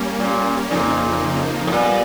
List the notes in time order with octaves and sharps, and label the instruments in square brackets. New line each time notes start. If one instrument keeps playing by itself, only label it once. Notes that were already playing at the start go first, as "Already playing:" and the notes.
Already playing: [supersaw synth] G3 A#3 C#4
[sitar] A#2
[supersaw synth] F2 C#3 F3 A#3 D#4 [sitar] A#2
[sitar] A2
[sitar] A#2 [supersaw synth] G3 B3